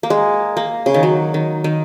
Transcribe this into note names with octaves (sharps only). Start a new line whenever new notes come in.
A#3
G#3
A#3
C#3
D#3
F#3
D#3
D#3